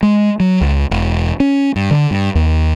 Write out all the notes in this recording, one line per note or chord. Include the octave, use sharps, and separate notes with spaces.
G#3
F#3
C#2
E1
C#4
G2
D3
G2
D#2